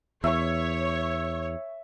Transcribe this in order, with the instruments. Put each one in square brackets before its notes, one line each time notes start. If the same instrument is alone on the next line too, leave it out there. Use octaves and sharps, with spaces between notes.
[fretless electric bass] E2 [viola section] C#5 [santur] E5 C#6